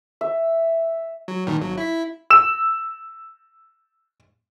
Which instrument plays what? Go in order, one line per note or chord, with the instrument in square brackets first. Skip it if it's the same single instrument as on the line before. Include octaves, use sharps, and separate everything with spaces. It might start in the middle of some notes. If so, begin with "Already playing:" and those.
[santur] E5
[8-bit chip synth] F#3
G2 A#2 D#3
G#1 F#3
E4 B6
[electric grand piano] E6 E7